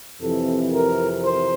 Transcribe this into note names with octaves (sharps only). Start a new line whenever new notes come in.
F2 C3 E3 A4
A#4
C5